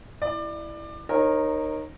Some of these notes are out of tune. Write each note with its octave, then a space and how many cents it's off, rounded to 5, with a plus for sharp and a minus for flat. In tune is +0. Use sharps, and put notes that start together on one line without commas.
E4 +0 D5 +25
D#4 -20 A#4 +0 C#5 -35